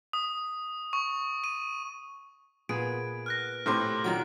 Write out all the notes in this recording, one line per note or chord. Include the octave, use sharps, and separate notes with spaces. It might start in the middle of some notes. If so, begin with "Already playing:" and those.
D#6
C#6
D#7
A#2 B3 G#4 D7
F6 F#6 A#6
A2 C3 C6 F6
A#2 D#3 F#3 D7